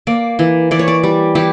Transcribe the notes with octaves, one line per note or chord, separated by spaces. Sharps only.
A#3 D5
E3
E3 D5
C#5
D5
G3
E3 G4